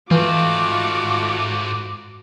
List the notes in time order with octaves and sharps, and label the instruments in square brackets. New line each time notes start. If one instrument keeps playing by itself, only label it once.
[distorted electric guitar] G#2 C4 [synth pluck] E3 [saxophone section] A3 F4 [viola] F#4 D6